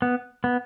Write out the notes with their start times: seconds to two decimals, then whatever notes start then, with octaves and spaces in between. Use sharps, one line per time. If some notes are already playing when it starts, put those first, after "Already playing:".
0.02 B3
0.44 B3